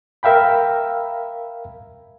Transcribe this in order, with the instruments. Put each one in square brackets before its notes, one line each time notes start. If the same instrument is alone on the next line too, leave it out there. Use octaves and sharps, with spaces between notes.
[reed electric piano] A#4 E5 F5 G5 B5